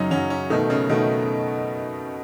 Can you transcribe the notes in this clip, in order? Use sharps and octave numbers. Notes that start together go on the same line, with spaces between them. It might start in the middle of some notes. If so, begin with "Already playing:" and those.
Already playing: F#2 C#3 F#3 C#4 D#4
F#2 C#3 F#3 C#4
C#4
B2 D#3 A3 D#4
C#3
B2 D#3 A3 D#4